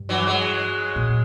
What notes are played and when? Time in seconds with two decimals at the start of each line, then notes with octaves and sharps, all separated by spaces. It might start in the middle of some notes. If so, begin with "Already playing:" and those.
Already playing: G2
0.09 E3 F#3
0.27 F#3 G#3
0.96 A#2